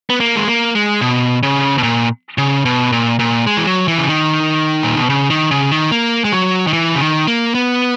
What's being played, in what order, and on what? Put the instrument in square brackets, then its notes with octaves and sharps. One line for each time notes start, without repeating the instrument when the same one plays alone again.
[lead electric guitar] B3
A#3
G#3
A#3
G#3
B2
C#3
B2
A#2
C#3
B2
A#2
A#2
G#3
E3
F#3
E3
C#3
D#3
A#2
B2
C#3
D#3
C#3
D#3
A#3
G#3
F#3
D#3
E3
C#3
D#3
A#3
B3